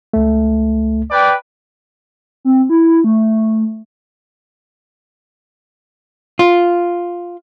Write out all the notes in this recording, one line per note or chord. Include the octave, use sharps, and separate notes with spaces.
C#2 A3
B4 D5 G5
C4
E4
A3
F4